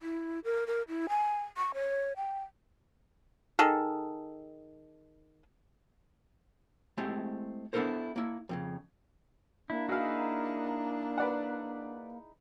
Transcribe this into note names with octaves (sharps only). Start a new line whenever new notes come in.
E4
A#4
A#4
E4
G#5
C#6
C#5
G5
D#3 D#4 G#4 A4
G#3 A3 C4 E4 G4
B3 D4 E4 A4 A#4 C5
A#3 E4
F2 A2 C#3
A#3 D4 E4
D#4 E4 F#4 G#4 F5
B4 D5 F#5